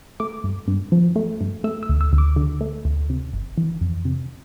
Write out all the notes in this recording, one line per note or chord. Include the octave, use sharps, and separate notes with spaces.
A3 D6
G2
G2
F3
A3
G2
A3 E6
E6
D2
E6
D2
D6
D3
A3
D2
C3
G1
E3
F2
C3